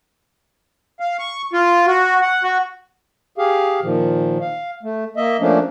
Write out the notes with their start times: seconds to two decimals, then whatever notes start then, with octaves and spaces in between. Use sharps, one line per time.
1.00 F5
1.19 C#6
1.53 F4
1.88 F#4
2.22 F#5
2.43 F#4
3.38 G4 G#4 F5
3.83 A#2 D#3 F3
4.41 F5
4.83 A3
5.17 A#3 D#5 E5
5.40 F3 A3 A#3 C#4 D4